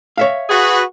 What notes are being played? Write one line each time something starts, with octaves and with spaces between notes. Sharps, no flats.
C#5 E5 F5
F#4 G#4 B4